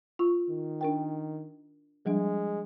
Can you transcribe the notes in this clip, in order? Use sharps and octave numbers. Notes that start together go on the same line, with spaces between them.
F4 C#6
D#3
D4 A#4 G5
F3 G3 G#3 D4